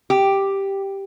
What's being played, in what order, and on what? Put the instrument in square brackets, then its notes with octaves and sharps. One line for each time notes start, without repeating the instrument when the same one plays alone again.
[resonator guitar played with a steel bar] G4